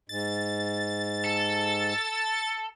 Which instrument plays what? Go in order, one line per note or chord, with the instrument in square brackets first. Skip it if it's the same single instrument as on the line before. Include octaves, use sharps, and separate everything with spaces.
[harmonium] G#2 [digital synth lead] A6
[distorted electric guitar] A4